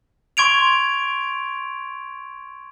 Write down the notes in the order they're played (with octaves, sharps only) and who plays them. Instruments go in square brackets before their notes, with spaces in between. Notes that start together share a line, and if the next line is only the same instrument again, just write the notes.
[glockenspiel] C6 C#6 G#6 D7 F7